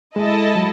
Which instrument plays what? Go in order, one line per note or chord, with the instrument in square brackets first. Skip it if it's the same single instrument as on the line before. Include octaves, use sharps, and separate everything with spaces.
[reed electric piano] G#3 [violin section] E4 A4 D#5 A5
[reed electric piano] F#3